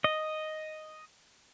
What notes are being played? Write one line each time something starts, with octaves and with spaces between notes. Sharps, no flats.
D#5